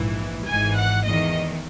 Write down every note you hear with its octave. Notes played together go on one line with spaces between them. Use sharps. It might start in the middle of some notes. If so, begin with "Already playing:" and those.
Already playing: A#1 G#2 E3
G#1 G#2 E3 G#5
F#5
E2 D#3 D#5